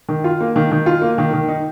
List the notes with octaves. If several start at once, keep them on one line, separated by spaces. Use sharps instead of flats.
D#3
F4
A#3
D#3
D#3
F4
A#3
D#3
D#3
D#4